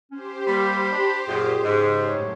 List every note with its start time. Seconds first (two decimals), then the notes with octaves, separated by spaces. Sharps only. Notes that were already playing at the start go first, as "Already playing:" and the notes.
0.12 C#4 G4 C5
0.47 G3 A#3 B5
0.91 D4
1.28 F#2 A#2 G#4
1.62 G#2 C#3
2.04 F#2 A2 C#5